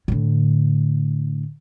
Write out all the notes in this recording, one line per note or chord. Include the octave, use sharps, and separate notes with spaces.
A2 D3